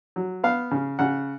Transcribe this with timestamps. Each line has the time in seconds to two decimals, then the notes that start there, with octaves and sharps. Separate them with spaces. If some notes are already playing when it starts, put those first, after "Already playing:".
0.16 F#3
0.44 B3 F5
0.71 C#3
0.99 C#3 F#5